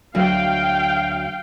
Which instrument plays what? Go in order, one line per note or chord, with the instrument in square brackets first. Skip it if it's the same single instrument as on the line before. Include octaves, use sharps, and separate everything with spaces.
[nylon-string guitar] D2 F#3 [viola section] F5 G5